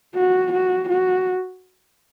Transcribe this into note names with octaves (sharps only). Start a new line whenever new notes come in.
F#4
F#4
F#4